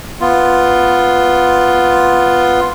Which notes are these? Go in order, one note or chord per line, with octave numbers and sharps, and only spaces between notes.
B3 F4